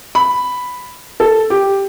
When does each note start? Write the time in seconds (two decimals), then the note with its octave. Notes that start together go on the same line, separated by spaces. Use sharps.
0.15 B5
1.20 A4
1.50 G4